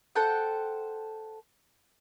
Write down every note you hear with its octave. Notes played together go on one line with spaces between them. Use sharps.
A4 C5 F#5 G5